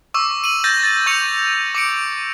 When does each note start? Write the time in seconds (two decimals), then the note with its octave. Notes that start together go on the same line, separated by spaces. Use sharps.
0.14 C#6 D6 E6
0.44 D#7 F#7
0.64 G6 A6 A#6
0.84 A6
1.06 C#6 G6 C#7 F7
1.75 D6 C#7 D7